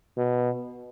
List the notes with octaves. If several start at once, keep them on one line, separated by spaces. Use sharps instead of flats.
B2